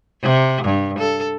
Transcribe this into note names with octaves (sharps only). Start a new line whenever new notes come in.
C3
G2
A4